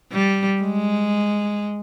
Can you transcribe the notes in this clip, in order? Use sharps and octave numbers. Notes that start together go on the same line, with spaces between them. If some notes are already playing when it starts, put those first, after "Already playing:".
G3
G#3